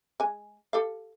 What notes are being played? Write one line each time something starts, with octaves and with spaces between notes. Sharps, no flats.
G#3 G#5
G4 A4 F5